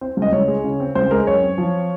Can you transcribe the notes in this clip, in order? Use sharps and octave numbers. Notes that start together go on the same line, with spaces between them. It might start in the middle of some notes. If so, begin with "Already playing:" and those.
C4 C5
C#2
D#5
C#2 C#5
G#3
C#3
C4
C#2 C5
G#3 A#4
F#2 C#5
C4
F3